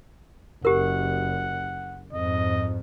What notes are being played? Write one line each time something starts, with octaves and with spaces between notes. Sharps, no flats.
F#1 G4 A#4 F#5
F2 G#2 D#5